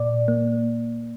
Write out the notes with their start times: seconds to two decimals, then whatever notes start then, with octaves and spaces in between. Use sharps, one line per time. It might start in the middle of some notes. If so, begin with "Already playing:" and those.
Already playing: A#2 D5
0.28 A#3